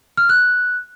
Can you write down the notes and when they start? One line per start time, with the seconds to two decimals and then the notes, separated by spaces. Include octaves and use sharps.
0.17 F6
0.29 F#6